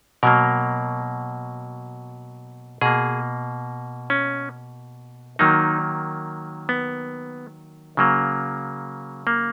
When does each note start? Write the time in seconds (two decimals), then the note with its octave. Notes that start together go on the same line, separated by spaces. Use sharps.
0.23 B2 F#3 A#3 A#4
2.81 B2 A#3 G#4
4.10 C#4
5.39 D#3 F#3 A#3 D#4
6.69 B3
7.97 C#3 F#3 A#3
9.27 A#3